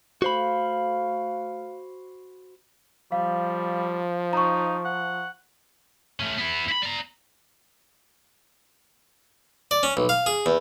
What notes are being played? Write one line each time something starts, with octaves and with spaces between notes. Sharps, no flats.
A3 F#4 C5 F5 B5
F3 G3 F5
D#4 A#5 C#6
F#5
A3 C#4
B3 E4
E4 B5
D5 A#5
D5
C#4
B1
F5
G#4
E2